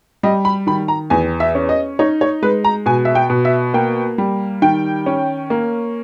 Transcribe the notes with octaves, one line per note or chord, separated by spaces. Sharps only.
G3 D#5
B5
D#3 B5
A#5
E2 G#5
E5
C#4
D#5
D#4 C#5
C#5
G#3 B4
A#5
B2 G#5
E5
G5
B2
E5
A#3 G5
G3
D#3 G5
C#4
A#3